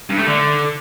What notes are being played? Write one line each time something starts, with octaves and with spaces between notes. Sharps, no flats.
G2
A3
D3